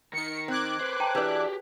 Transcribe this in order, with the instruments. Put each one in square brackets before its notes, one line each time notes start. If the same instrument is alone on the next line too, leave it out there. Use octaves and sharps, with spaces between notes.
[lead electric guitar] D#3 D#4 [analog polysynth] C#7
[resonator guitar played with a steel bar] C4 [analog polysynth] D6 F#6 G#6
[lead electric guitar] B4 C5
[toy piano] G5 A5 A#5
[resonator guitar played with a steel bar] E3 D4 [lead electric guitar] G4 G#4 [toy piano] A#4 B4 C#5